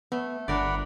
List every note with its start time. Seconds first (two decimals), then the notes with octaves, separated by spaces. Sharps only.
0.12 A3 B3
0.48 G1 D3 D4 A#4 D5 F#5 B5